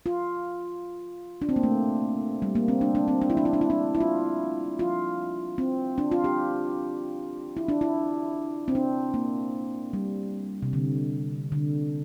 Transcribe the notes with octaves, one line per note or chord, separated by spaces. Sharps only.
F4
D4
C4
A#3
A3
G3
A#3
C4
D4
D4
C4
D4
E4
D4
E4
D4
E4
D4
E4
F4
F4
C4
D4
F4
G4
E4
D4
E4
C4
D4
A#3
G3
C3
D3
D3